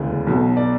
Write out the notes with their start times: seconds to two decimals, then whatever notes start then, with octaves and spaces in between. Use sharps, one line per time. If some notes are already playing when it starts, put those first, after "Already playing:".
Already playing: E1 D2 C#3 E3
0.27 B1 B2 F#3
0.57 D5